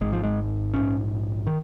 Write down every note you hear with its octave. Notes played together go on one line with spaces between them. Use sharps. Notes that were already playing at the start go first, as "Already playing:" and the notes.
G#1 G#2 G#3
F3
G#3
A#1 G#2 C#4
D#3